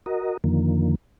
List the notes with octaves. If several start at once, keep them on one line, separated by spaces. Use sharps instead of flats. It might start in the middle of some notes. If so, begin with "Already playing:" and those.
F#4 A#4 D#5
F2 D3 D#3 F3 A#3